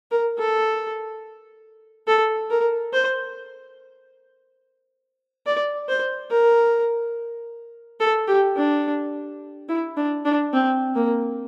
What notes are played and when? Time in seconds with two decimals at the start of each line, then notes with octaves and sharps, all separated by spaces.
0.11 A#4
0.39 A4
2.07 A4
2.50 A#4
2.93 C5
5.46 D5
5.89 C5
6.30 A#4
8.00 A4
8.28 G4
8.56 D4
9.69 E4
9.97 D4
10.25 D4
10.53 C4
10.95 A#3